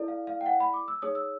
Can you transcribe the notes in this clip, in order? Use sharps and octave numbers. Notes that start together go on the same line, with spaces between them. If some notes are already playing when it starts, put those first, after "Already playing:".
Already playing: E4 A4 D5
F5
F5
G5
F#5
B5
D6
E6
D#4 G#4 C#5 D#6
E6